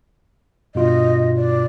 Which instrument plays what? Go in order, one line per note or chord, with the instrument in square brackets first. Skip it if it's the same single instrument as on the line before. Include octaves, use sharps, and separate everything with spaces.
[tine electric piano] G2 B2 F4 [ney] D#5
[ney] D5